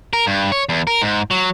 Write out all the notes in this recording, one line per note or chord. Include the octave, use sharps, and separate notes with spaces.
A#4
G2
C#5
E2
A#4
G#2
F#3